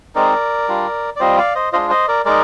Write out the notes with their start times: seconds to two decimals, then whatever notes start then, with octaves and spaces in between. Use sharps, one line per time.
0.15 G#3 C4 D#4 A#4 D5
0.68 G3 D4 F4
1.16 D5
1.20 G3 C4 F4 C5 D#5
1.38 D5 F5
1.55 C5 D#5
1.73 G#3 D4 F4 C5 D#5
1.90 C5 D#5
2.08 A#4 D5
2.25 G#3 D#4 A#4 D5